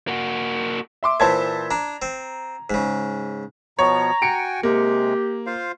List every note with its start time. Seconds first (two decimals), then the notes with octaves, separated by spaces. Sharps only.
0.08 A#3 F#4
1.03 E5 C6 D6
1.20 A#2 E3 C5 A5 G#6
1.71 D4 A#5
2.02 C4
2.70 G#2 C#3
3.79 B2 F3 B3 C#5 A#5
4.22 F#4 G5 G#5 C#7 D7
4.63 C3 G#3 A#3 G4
5.47 F4 C5 F5